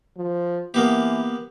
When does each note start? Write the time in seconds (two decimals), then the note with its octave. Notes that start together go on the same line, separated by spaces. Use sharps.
0.17 F3
0.74 E3 A#3 B3 G4